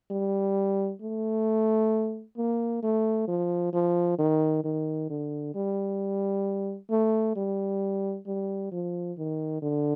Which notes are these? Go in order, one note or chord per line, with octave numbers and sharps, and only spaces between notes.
G3
A3
A#3
A3
F3
F3
D#3
D#3
D3
G3
A3
G3
G3
F3
D#3
D3